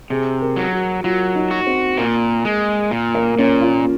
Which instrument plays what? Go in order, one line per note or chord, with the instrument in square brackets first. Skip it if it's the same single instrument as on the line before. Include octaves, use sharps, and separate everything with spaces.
[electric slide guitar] C3 [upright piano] G#4
[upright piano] A#4
[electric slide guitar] F#3
[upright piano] F#4
[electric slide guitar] F#3 [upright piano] F4
[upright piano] D#4
[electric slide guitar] F#4
[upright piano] C4
[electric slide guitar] A#2 [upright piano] A#3
[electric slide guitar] G#3
A#2
[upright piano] A#3
[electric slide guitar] A#2 [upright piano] C#4
[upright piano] F4